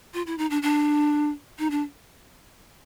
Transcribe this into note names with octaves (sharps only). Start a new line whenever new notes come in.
F4
E4
D#4
D4
D4
D#4
D4